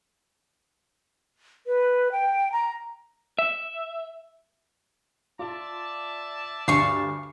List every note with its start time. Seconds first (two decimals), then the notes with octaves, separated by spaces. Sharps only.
1.67 B4
2.12 G5
2.52 A#5
3.39 E5
5.39 F4 D5 E5 A5
6.68 D2 G2 F5 C#6